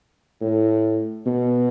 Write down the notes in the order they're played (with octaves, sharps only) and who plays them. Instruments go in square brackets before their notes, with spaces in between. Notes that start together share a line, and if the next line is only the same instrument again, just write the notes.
[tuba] A2
B2